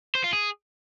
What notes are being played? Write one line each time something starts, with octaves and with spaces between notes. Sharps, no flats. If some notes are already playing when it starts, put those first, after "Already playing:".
C5
F4
G#4